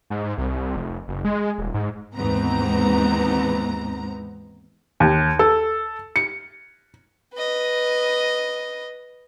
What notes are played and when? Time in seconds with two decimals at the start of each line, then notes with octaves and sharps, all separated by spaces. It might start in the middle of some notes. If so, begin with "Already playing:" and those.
0.10 G#2
0.24 G#2
0.38 C2
0.76 F1
1.08 F#1
1.25 G#3
1.58 D#1
1.74 G#2
2.14 D#2 G#2 E3 B3 C4 A#5
5.00 D#2
5.39 A4
6.16 C#7
7.34 B4 D#5